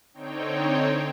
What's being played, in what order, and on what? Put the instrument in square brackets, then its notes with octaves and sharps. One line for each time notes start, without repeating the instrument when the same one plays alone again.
[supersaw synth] D3 C4 D#4 C#5 G5